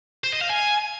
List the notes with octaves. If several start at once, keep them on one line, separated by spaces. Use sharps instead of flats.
C5
D#5
F5
G#5